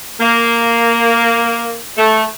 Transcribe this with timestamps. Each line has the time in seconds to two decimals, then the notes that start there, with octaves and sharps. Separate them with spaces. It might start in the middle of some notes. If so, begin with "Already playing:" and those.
0.20 A#3
1.98 A3